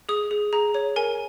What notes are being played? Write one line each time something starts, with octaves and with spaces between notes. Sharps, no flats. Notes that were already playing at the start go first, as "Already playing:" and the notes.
G#4 D#6
G#4
G#4 A#5
C#5
A#4 G#5